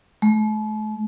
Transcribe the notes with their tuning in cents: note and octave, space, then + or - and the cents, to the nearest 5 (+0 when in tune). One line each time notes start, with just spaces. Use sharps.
A3 -40